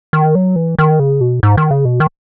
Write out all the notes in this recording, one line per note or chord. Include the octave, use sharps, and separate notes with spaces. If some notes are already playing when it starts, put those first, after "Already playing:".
D#3
F#3
E3
D#3
C#3
B2
G#2
D#3
C#3
B2
D#3